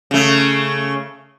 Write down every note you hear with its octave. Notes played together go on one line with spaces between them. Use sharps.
C#3 A3